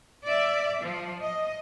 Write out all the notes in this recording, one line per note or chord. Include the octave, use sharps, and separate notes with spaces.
D5 E5
F3
D#5